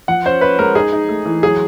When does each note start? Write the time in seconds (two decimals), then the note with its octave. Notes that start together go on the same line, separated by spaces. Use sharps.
0.08 F3 F#5
0.26 C#4 C5
0.41 C#4 B4
0.59 G#3 A#4
0.75 D#4 G#4
0.93 D#4
1.09 A3
1.26 E3
1.43 F#3 G#4